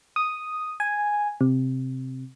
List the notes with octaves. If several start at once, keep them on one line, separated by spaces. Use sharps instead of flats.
D#6
G#5
C3